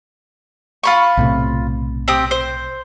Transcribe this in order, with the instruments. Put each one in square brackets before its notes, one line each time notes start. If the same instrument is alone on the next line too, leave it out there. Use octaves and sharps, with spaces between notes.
[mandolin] F4 B5 C#6
[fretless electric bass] B1 A2 C3
[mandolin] C4 G4 D#6
C5